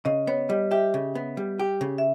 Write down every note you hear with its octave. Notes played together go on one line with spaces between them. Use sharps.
C#3 D#5
B3 C#5
G3 D#5
G4 E5
C#3
B3
G3
G4
C#3
E5